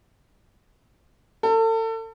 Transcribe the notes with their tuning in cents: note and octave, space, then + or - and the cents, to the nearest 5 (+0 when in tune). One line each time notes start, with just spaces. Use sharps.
A4 +35